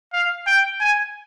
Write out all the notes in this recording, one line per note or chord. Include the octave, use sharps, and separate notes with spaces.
F5
G5
G#5